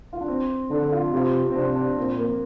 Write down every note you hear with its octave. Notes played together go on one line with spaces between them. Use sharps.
F4
D4
C4
D3 D4
F4
C3 F4
C4
C3 D4
D4
A#2 C4
A#3